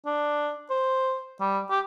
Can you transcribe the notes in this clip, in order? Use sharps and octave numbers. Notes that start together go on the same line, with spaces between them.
D4
C5
G3
G4